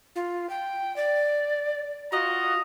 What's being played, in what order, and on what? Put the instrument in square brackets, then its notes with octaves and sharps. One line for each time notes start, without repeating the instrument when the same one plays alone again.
[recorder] F4
G5
D5
[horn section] F4 D#5 A#5 [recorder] F#4